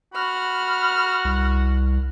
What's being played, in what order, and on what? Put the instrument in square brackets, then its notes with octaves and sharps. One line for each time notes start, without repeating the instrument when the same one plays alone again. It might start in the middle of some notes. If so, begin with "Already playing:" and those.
[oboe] F#4 [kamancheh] B5 F6
[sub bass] C2